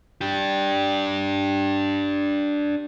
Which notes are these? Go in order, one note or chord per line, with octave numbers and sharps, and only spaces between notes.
D4 G4